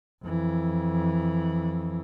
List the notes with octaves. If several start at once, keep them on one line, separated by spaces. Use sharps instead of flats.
F2 E3